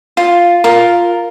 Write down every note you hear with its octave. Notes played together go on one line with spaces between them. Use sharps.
F4
F4 A#4